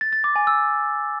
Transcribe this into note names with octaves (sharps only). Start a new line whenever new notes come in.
A6
A6
D6
G#5
E6